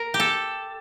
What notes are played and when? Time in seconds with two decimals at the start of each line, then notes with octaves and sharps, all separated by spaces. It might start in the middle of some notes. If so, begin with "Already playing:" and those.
Already playing: A#4
0.14 G4
0.20 A4